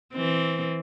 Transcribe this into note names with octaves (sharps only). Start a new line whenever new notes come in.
E3 C4